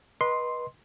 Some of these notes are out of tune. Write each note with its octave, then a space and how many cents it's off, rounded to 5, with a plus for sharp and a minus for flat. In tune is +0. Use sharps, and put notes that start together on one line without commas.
B4 -25 D#5 +0 C6 +0